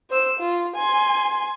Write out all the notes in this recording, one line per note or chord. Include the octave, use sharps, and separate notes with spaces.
C5 E6
F4
G#5 C6